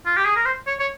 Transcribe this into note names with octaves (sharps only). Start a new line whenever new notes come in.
F4
G4
G#4
A#4
C5
C#5
C#5